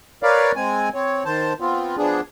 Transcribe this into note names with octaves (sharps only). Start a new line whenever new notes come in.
A#4 B4 C#5 D5 F5
G#3 C4 G#5
C4 C#5
D#3 C5 A5
B3 C4 F4
F3 B3 D4 G#4